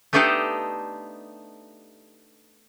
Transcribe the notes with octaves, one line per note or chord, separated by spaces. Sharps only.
A3 B3 D4 D#4 G4 A4